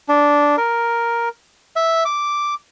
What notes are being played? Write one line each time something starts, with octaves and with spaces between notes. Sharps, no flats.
D4
A#4
E5
D6